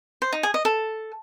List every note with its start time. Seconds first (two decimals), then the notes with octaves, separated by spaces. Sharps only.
0.22 C5
0.32 D#4
0.43 G#4
0.54 D#5
0.65 A4